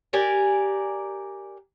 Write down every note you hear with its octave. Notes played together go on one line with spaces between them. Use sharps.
G4 A#4 D5 G#5